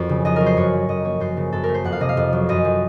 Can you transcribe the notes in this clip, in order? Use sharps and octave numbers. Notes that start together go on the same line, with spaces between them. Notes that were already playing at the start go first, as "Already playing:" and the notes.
Already playing: F2 F#3 A#4 C5
C#3
F2 D#5
F#3 A#4
C5
F#2 C#5
F3
F#2 D#5
A#3 C#5
F#2 C5
C#3
F#2 A4
A#4
A3
C5
F2 F#5
F5
C3 D#5
F5
F2
F#3
F#2 D#5
F3